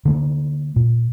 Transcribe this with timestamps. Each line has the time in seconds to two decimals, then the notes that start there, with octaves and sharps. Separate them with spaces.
0.05 D3 A3 A#3
0.76 A#2